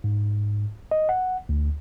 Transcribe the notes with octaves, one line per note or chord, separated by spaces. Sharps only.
G#2
D#5
F#5
D2